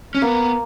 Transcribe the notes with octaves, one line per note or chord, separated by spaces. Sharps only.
C#4
A#3 B3